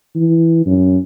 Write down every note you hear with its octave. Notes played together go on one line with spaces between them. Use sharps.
E3
F#2